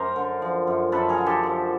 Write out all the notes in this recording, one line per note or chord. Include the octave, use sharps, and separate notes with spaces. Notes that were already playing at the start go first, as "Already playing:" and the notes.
Already playing: F#2 A#4 C5
D3
F3
F#2
F#2 A4 B4
G#4 A#4
D3
G4 A4
F3